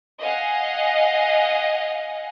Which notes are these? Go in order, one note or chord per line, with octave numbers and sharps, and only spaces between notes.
D#5 F5 F#5 G#5